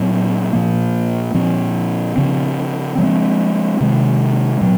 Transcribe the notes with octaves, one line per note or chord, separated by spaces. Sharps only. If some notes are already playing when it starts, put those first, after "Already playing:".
Already playing: A#2 F#3 C4
A#2 F3 A#3
A#2 F3 C4
C#3 F3 C4
F3 G#3 C4
C3 D#3 G#3
A#2 F#3